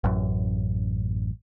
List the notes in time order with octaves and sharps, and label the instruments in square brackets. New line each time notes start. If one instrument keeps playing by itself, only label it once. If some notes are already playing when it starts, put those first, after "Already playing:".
[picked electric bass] A1 F#2